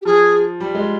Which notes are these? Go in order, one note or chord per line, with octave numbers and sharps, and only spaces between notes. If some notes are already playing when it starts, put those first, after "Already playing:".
G4
F3 G#4
G3
G#3